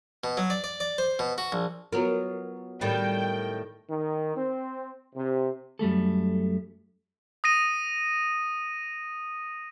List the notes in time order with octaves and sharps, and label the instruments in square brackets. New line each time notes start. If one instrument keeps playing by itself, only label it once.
[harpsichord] B2
F#3
D5
D5
D5
C5
B2
F#4
A#1
[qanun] F#3 B3 F4 [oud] A#4
[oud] A2 D#3 G3 [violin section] G5
[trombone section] D#3
C4
C3
[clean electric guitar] F#2 G3 A3 A4
[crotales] D#6 A#6 D#7